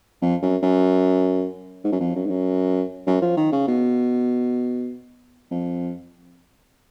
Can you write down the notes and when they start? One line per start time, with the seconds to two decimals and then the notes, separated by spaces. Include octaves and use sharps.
0.22 F2
0.42 F#2
0.63 F#2
1.84 G#2
1.92 F#2
2.00 F2
2.15 F#2
2.26 G#2
2.30 F#2
3.07 F#2
3.22 F3
3.37 D#3
3.52 C#3
3.67 B2
5.51 F2